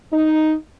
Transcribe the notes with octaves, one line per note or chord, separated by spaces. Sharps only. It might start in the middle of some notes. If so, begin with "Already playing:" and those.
D#4